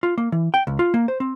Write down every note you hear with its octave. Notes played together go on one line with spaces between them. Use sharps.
F4
A#3
E3
G5
C#2
F4
A#3
C5
C4